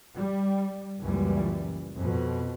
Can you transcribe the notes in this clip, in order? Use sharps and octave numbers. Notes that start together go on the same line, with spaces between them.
G3
C#2 F#2 A#2 E3 G3
F2 B2